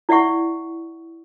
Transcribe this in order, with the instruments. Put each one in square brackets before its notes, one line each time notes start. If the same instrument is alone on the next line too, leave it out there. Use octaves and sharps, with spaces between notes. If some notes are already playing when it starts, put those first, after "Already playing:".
[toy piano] E4 D5 E5 F#5 C#6